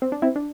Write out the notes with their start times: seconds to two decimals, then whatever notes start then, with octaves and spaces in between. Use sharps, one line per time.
0.02 C4
0.12 D4
0.22 C4 E4
0.36 D4